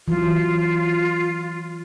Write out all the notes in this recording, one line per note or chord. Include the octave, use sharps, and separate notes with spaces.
E3 F#3 F4